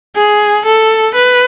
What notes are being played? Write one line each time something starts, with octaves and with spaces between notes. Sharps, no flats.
G#4
A4
B4